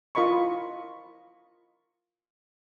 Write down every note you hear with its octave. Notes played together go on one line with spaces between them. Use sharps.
E4 F4 A#4 D#5 B5 C#6